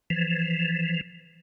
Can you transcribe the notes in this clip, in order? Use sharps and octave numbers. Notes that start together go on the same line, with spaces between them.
E3 F3